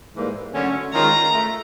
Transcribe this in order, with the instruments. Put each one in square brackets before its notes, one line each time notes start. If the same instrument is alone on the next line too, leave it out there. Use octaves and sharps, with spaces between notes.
[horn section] G#2 E3 G3 A#3
D3 F#3 A3 C#4
[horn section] D#3 G#3 C#4 F4 [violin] A#5
[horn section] A3